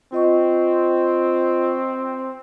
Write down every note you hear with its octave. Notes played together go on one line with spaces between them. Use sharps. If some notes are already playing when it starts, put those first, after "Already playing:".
C4 F4 D#5 C#6